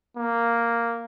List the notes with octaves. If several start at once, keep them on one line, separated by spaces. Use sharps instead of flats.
A#3